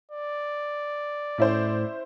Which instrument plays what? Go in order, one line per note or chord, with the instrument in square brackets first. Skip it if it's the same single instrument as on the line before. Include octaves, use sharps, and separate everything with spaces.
[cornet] D5
[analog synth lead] A2 [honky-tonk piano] C#4 E4 C5